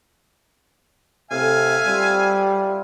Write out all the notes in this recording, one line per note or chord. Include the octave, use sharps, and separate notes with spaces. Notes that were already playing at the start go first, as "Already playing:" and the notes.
A2 C3 E5 F5 G#5
G3 C4 F4 C6